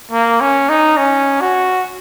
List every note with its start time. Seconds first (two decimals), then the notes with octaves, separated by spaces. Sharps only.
0.11 A#3
0.40 C#4
0.69 D#4
0.97 C#4
1.41 F#4